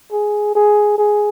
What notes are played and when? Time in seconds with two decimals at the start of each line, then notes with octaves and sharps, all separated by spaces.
0.12 G#4
0.56 G#4
0.98 G#4